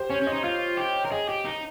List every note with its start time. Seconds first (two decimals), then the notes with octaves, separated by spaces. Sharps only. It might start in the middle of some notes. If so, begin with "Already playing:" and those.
Already playing: G4 C5
0.10 C#4 C#5
0.22 C#4
0.27 D#5
0.33 D#4
0.44 F4 F5
0.77 G4
1.05 A#4
1.12 G#4 D#5
1.29 G4
1.45 D#4